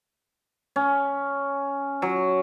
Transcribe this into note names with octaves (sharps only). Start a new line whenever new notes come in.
C#4
F#3